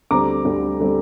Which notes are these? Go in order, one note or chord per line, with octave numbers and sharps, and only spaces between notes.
D2 D3 G3 C4 A#5 D6
D2 D3 G3 C4
D3 G3 C4